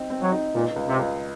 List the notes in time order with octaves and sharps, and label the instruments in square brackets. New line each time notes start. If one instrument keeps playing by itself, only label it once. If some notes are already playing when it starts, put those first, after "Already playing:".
Already playing: [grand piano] C4 D#4
C4
[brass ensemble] F#3
[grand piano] D#4
[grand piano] C#2 [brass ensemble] A#2
[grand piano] C#2
[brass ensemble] C3
[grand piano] C#2